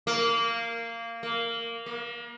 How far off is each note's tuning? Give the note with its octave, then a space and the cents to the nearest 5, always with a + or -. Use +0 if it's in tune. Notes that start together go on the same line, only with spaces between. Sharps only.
A#3 -15
A#3 -10
A#3 +35